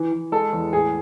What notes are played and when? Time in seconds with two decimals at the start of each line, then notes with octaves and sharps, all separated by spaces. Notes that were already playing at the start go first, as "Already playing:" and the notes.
Already playing: E3
0.12 E3
0.32 G#3 A4
0.52 E2
0.73 A2 G#4